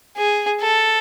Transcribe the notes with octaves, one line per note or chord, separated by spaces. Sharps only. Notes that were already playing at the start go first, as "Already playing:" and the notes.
G#4
A4